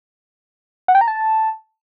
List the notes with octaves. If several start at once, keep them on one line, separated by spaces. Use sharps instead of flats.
F#5
G5
A#5
A5